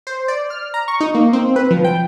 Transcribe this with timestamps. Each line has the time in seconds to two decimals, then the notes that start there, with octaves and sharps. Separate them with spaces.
0.07 C5
0.28 D5
0.50 F6
0.74 A#5
0.88 C#6
1.01 D#4
1.15 A#3
1.33 C4
1.56 B4
1.71 F3
1.85 G5